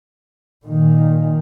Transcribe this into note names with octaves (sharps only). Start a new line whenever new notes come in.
A#2 D#3